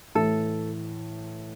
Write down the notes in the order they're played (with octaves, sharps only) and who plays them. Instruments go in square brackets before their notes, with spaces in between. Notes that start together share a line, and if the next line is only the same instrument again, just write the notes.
[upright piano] A2 E3 A3 [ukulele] A4